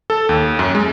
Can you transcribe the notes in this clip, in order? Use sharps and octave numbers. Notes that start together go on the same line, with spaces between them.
A4
D#2
F#2
G#3